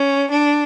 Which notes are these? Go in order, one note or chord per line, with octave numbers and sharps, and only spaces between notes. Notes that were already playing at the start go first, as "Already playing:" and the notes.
Already playing: C#4
D4